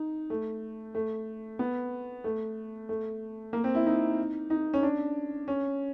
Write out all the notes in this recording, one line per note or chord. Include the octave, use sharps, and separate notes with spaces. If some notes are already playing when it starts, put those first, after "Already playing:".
Already playing: D#4
A3
A3
B3
A3
A3
A#3
C4
E4
D#4
D#4
C#4
D4
C#4